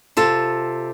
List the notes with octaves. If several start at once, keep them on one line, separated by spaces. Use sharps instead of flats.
C3 F4 A4